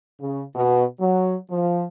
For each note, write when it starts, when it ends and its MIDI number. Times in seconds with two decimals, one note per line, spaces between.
0.21 0.42 49
0.55 0.83 47
1.00 1.36 54
1.50 1.85 53